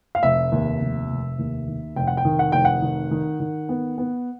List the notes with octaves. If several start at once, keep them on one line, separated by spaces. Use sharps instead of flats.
F5
F1 E5
D#2
F1
F1
D#2
D#3
F1 G5
F#5
G5
D#3
F#5
F1 G5
F#5
D#3
D#3
D#3
B3
B3